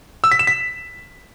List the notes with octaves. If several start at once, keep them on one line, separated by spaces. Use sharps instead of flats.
E6
B6
E7
B6